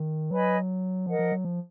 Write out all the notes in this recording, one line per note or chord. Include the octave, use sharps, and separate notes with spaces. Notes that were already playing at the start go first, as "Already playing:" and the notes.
Already playing: D#3
F#3 B4 D#5 G#5 B5
F3 A#4 D#5 F#5
F3
F#3
F3